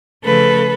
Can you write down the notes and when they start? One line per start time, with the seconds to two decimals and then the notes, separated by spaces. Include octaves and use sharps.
0.24 C#3 F3 A3 A4 B4